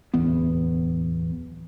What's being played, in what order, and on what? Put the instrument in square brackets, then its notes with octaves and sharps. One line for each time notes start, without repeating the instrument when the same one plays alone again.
[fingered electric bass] D1 E2 B3